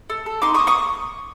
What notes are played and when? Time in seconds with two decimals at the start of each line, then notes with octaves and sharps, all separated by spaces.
0.10 A4
0.26 A4
0.42 D#4 C6 D6
0.54 C#6 D#6
0.59 A#3
0.67 C#6 D#6